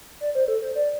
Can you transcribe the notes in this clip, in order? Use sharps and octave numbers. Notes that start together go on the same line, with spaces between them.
D5
C5
A4
C5
D5